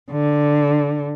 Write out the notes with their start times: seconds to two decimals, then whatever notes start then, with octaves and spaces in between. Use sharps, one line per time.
0.11 D3